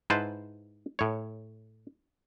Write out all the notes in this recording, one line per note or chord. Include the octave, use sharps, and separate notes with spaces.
G#2 E4 B4 C5 A5
A2 C#5